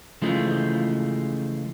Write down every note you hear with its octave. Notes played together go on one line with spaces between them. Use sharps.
C#3 E3 F3 G#3 A3